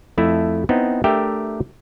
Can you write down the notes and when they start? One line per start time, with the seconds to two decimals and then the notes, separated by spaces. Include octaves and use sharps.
0.18 F2 A3 E4
0.69 B3 C4 D#4 E4
1.04 A3 D4 G4 A#4 E5 G5